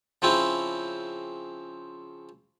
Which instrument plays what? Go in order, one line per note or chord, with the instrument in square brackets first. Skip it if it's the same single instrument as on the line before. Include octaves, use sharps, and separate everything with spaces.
[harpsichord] C#3 F3 C4 C#4 E4